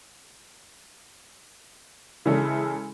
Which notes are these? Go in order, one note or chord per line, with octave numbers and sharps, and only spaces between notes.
C#3 E3 G#3 C#4 E4 A4